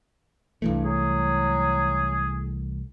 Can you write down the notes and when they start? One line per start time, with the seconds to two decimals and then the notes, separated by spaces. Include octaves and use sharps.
0.62 C2 G2 E3 A3
0.85 F#3 G#4